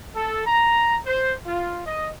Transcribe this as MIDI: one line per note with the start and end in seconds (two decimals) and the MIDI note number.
0.14 0.44 69
0.45 0.97 82
1.05 1.32 72
1.45 1.80 65
1.85 2.09 75